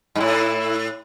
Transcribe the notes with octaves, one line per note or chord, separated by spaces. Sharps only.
G#2
A2 E4